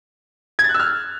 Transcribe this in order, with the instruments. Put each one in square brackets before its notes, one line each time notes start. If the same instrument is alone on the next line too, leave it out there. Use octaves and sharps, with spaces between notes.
[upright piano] G#6
A6
F#6
E6
F6